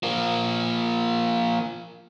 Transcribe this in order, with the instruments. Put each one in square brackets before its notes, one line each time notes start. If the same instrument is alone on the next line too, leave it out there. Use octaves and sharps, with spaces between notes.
[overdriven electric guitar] F3 A#3